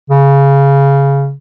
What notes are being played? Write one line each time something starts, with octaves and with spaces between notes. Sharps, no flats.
C#3